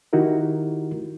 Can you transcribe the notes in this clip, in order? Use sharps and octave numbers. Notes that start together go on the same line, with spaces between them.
D#3 D#4 E4 F#4 G4 A#4